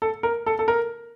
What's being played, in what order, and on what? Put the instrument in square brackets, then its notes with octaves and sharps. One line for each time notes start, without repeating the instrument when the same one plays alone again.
[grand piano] A4
A#4
A4
A4
A#4